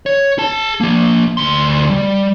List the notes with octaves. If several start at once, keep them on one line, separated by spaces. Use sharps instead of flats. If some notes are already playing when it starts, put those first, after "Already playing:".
C#5
G#4 A5
F3 A#3
D2 C6
G3